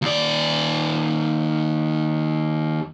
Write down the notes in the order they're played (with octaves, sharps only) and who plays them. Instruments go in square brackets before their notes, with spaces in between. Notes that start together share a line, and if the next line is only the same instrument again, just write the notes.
[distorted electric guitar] D#2 D5